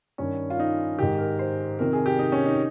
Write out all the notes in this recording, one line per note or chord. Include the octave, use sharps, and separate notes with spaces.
G2 D#3 C#4
F4
D#4
G#2 D#3 G4
A#4
C5
F2 C3 D#3 A#4
G#4
G4
D#4
C#4
D#4